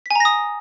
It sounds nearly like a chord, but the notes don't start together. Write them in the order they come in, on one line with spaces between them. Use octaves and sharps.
B6 G#5 A#5 A#6 D#6